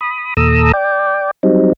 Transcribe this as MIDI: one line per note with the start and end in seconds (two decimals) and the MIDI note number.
0.01 0.34 83
0.01 0.34 87
0.37 0.72 39
0.37 0.72 46
0.37 0.72 69
0.37 0.72 82
0.37 0.72 87
0.37 0.72 88
0.73 1.31 74
0.73 1.31 79
1.43 1.73 54
1.43 1.73 55
1.43 1.73 60
1.43 1.73 63